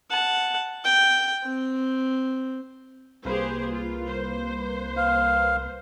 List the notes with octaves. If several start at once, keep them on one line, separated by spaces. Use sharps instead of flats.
F#5 A5
G5
C4
C2 A#3 G4 G#4 B4 C5
F4
C5
F5